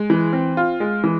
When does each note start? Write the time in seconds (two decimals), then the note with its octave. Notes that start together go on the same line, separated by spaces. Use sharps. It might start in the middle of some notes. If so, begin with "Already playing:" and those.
Already playing: G#3
0.10 E3
0.33 C4
0.57 F4
0.80 G#3
1.04 E3